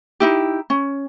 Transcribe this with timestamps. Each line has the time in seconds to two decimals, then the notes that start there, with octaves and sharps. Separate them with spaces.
0.20 D#4 E4 G4
0.70 C#4